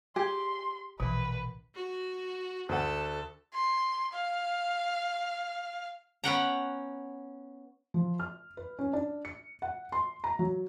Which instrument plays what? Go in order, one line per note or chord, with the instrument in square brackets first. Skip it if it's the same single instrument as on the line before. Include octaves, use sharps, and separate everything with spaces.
[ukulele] G4 [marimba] G#4 [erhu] C6
[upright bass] A#1 [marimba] B2 E3 [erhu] B4
[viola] F#4
[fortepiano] D2 F#5 [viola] A4
[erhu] C6
F5
[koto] B3 C#4 C#5 F#5 G5 A#5
[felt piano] F3
F6
B4
C#4
D4
C#7
F#5
C6
A#5
F#3